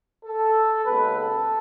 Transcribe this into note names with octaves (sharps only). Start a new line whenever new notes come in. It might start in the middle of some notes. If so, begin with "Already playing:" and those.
A4
D#2 C#3 G#3 B3 B4
A4